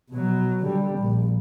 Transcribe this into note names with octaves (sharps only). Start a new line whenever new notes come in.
B2 F#3
D3 G3
A#1